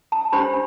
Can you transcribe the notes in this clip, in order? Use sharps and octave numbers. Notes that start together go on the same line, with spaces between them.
A5
D4 G4 C5 B5